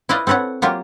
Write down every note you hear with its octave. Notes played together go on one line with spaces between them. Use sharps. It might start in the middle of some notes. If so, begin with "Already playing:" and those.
E4 F4 B4 D5 D#5 F5
C4 A4 B4 C#5 F#5
F#3 A#3 F4 G4